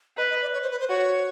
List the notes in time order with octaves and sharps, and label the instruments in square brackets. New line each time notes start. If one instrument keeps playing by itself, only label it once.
[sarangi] B4 [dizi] D#5
[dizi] D#5
D5
C#5
C5
B4
C5
[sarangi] F#4 [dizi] C#5